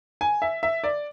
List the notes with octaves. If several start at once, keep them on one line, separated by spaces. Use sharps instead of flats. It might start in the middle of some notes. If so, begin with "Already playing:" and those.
G#5
E5
E5
D5